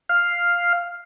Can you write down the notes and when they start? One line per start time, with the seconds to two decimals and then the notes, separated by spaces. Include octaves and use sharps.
0.09 F5